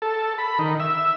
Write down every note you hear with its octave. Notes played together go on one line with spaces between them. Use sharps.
A4
B5
D#3
E5